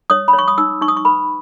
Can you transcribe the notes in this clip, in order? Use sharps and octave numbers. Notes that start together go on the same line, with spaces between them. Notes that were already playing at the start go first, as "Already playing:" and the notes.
C#5 D#6
B5
C#5
C#6
D#6
D#4 E6
D#4 C#6
D#6
C#6
B4 B5